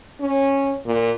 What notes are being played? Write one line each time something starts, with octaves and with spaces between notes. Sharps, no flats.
C#4
A#2